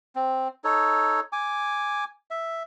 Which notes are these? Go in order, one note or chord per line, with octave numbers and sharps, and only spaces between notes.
C4
D#4 A4 C#5
G#5 D6
E5